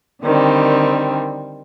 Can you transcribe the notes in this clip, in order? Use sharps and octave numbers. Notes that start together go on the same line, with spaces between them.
D3 D#3 G3 C4